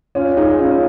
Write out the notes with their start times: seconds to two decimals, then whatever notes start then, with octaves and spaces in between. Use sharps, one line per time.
0.15 C#4 F4
0.37 D#4 G#4
0.59 C#4 F4